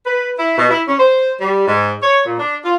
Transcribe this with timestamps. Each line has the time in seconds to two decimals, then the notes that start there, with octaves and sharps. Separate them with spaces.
0.06 B4
0.39 E4
0.58 B2
0.71 E4
0.88 C#4
0.99 C5
1.41 G3
1.67 G#2
2.01 C#5
2.25 A#2
2.39 D4
2.65 F4